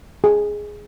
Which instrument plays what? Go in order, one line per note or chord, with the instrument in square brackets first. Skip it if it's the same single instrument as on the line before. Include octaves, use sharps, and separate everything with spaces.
[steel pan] G#4